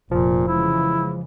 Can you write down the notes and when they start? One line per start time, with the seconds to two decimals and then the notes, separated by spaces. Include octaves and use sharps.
0.11 F1 A#2 F3
0.48 C#3 E3 G#3 E4